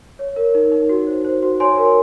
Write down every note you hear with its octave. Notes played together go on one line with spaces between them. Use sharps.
C#5
A#4
D#4
D#4
F#4
C5
C5
F#4
C#5 G#5 C6
A#4